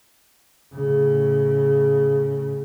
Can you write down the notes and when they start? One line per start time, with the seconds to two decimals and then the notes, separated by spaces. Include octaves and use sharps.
0.74 A2 C#3